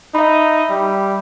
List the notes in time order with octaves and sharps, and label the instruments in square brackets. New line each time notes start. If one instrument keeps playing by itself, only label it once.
[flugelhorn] D#4 [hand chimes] E5 B5
[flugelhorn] G3